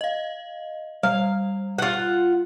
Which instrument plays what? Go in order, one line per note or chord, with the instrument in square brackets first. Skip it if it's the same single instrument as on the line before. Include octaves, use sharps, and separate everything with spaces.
[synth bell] D#5 F5
[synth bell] G3 [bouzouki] F5
[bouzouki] F4 F#5